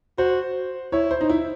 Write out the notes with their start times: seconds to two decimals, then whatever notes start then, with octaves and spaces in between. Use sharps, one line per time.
0.18 F#4 C5
0.92 E4 C#5
1.11 C5
1.21 D#4
1.29 E4